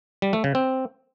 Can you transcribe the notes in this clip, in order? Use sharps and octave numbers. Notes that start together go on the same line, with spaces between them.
G3
A3
C#3
C4